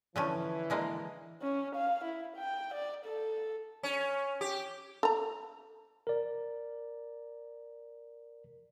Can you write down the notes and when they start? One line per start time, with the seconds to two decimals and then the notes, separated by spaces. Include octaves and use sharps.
0.16 D3 E3 F3 C#4
0.70 D3 G#3 A#3
1.42 C#4
1.76 F5
2.05 E4
2.37 G5
2.74 D5
3.05 A4
3.83 C#4
4.41 G4
5.03 A4 A#5
6.07 A#4 D5